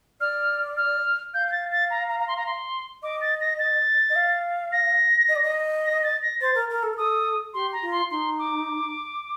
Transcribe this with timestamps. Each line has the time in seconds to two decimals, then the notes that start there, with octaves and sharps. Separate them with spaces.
0.20 D5 F6
0.77 F6
1.34 F5 G6
1.48 G6
1.52 A6
1.72 A6
1.90 A#5
2.09 A#5
2.20 A#5
2.28 C6
2.37 A#5
2.46 C6
3.03 D#5 D6
3.21 A6
3.41 A#6
3.59 A6
4.10 D#5
4.16 F5
4.72 A#6
5.29 D#5
5.36 D5
5.43 D#5
5.85 A#6
6.03 A6
6.22 A#6
6.41 C5 A6
6.55 A#4
6.70 A#4
6.83 A4
6.93 A#4
6.97 A4 D#6
7.54 G4 C6
7.73 A#5
7.82 F4
7.91 C6
8.10 D#4 C6
8.39 D6